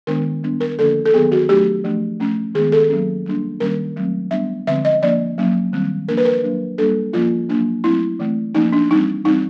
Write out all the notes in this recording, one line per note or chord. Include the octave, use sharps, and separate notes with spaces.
D#3 G#3 B3 D4 A#4
G3 B3 D4
A#4
D3 F3 A#3 D4 A4
A4
D#3 F#3 B3 G#4
F#4
F#3 A3 D4 G4
F3 A3 D4
F3 A3 C#4
D#3 G#3 B3 G#4
A4
F#3 A#3 C#4
G3 A#3 D4
D#3 G3 A#3 C#4 A#4
F#3 A3 C4
G3 B3 D4 E5
D3 F3 G#3 C4 E5
D#5
F3 A#3 D4 D5
F#3 A#3 C#4
D#3 G3 C4
F3 A#3 D4 A#4
B4
A#4
F#3 A#3 D4
G3 A#3 D4 A4
F3 A#3 C#4 F4
F#3 A#3 D4
F#3 A3 C4 E4
E3 A3 C4
F3 A#3 C#4 D#4
D4
E3 G3 C4 D#4
E3 G3 C4 D#4